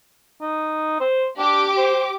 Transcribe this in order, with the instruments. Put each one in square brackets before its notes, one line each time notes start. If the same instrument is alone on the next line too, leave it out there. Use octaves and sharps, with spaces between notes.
[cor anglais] D#4
C5
[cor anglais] D4 [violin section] G4 D6
[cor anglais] C5